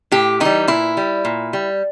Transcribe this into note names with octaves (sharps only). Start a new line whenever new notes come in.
A2 G4
E3 G3 D#4
A#2 E4
G3
A#2
G3